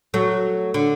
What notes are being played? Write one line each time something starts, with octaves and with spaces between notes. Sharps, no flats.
F#3 A3
D3